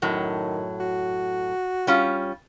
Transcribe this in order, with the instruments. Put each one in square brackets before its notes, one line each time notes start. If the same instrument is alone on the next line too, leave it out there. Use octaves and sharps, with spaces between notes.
[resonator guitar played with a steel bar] F#2 A2 F#3 [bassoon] D#3
[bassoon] F#4
[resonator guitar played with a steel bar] G3 C#4 F4